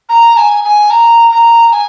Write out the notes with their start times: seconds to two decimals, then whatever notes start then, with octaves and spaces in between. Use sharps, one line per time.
0.09 A#5
0.37 G#5
0.64 G#5
0.90 A#5
1.31 A#5
1.71 G#5